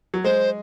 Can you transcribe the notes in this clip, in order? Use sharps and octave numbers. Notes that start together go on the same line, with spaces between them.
F#3
G#3 C5